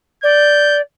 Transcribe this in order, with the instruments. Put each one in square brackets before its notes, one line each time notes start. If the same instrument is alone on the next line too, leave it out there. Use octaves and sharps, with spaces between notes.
[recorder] D5 [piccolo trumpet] G6